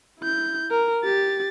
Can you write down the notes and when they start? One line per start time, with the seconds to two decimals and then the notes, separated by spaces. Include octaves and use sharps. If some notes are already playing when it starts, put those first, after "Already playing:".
0.20 E4 G6
0.71 A#4
1.04 G4 A6